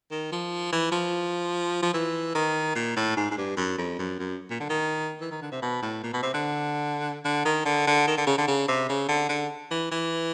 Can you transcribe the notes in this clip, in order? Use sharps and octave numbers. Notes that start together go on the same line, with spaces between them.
D#3
F3
E3
F3
F3
E3
D#3
A#2
A2
G#2
G#2
G2
F#2
F2
F#2
F#2
A#2
D3
D#3
E3
D#3
D3
C3
B2
A2
A#2
B2
C3
D3
D3
D#3
D3
D3
D#3
D3
C#3
D3
C#3
C3
C#3
D3
D3
E3
E3